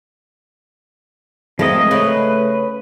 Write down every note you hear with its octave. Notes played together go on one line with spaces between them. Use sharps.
F3 G#3 A3 C4 A#4 D#5
C#3 A3 B4